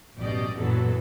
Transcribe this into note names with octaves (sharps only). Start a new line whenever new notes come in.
A1 F#2 B2 G4 D5 D#5
F#2 A#2 E3 F#3 B3 A4